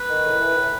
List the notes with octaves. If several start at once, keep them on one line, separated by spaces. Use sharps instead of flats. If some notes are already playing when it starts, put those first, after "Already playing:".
Already playing: B4
D#3
A2
E3
A2